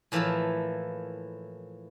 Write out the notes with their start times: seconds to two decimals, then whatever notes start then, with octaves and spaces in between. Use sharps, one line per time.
0.12 A2 E3 F3 A#3 E4 A4